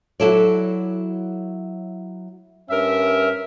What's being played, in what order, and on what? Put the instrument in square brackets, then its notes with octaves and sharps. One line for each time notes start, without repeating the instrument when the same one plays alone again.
[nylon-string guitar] F#3 E4 F#4 A4 C#5 D5
[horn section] G2 C#4 A#4 E5